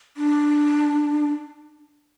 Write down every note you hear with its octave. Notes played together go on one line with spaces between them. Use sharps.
D4